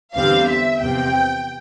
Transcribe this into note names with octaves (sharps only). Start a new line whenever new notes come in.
E2 D3 G3 C4 F5
E5
E2 C3 F3 C4 G5